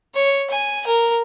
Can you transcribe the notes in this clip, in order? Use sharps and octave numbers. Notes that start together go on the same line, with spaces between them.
C#5
G#5
A#4